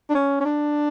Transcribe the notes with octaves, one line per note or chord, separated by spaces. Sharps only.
D4
C#4
C#4
D4